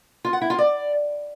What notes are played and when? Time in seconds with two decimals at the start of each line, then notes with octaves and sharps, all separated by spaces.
0.25 F4
0.33 F#5
0.42 E4
0.50 F4
0.59 D5